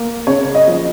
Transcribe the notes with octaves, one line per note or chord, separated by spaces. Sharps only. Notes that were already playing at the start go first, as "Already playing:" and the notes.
Already playing: A#3
C#3 C#5
D#5
F3